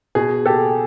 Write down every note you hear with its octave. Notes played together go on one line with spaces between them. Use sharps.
B2 G#4
G4 A4